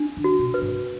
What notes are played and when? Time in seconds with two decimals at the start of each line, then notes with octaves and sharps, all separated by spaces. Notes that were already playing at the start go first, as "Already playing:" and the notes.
Already playing: D4
0.17 D3
0.24 F#4
0.39 B2
0.54 B4
0.62 G#2